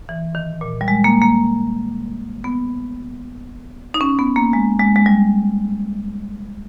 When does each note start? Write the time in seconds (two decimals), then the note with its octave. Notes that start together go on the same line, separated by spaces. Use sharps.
0.09 E3
0.35 D#3
0.61 A#2
0.81 G3
0.88 G#3
1.04 A#3
1.22 A#3
2.44 B3
3.94 D#4
4.01 C#4
4.19 B3
4.36 A#3
4.53 G#3
4.80 G#3
4.96 G#3
5.06 G3